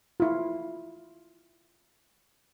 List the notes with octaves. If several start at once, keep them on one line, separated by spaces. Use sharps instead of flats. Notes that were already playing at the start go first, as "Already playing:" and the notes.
E4 F4